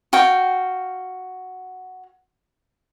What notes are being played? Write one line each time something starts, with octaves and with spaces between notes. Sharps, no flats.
F#4 F5 G5